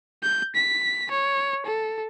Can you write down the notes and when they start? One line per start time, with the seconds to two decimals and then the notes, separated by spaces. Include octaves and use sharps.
0.23 G6
0.55 B6
1.11 C#5
1.65 A4